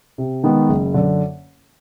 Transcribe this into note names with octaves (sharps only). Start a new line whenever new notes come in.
C3
D#3 G#3 B3 D#4
F#1
F#2 D3